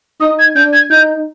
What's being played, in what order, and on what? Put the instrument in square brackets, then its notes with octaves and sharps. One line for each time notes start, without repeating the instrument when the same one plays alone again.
[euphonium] D#4 [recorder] D#6
[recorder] G#6
[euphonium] D4 [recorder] G6
[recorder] G#6
[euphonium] D#4 [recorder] G6